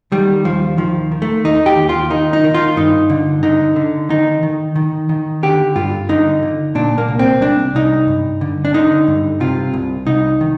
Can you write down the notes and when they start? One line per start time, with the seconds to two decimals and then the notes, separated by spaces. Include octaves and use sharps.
0.12 D#3 G3
0.44 D#2 F3
0.77 D#3 F3
1.12 D#3
1.22 A3
1.44 D#2 D#4
1.66 G4
1.78 D#2
1.89 F4
2.10 D#3 D#4
2.33 D#4
2.44 D#3
2.54 F4
2.76 G2 D#4
3.10 D3
3.43 D3 D#4
3.76 D3
4.09 D#3 D#4
4.43 D#3
4.76 D#3
5.09 D#3
5.43 D3 G4
5.76 G2 F4
6.09 D3 D#4
6.43 D3
6.75 A#2 D4
6.98 A#3
7.08 C2
7.19 C4
7.41 C2 D4
7.75 C2 D#4
8.08 G2
8.41 D3
8.65 D4
8.74 D3 D#4
9.07 G2
9.40 C3 F4
9.73 C2
10.07 C2 D#4
10.41 D#3